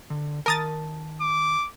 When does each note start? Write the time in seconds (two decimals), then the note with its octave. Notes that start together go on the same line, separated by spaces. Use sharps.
0.10 D3
0.46 D#3 A#4 A5 D#6 A6
1.21 D6